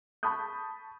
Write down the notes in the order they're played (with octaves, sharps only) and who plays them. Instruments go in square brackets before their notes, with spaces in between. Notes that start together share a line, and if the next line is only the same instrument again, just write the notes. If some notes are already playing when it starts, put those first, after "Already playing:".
[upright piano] A5 B5 C#6 D#6 G6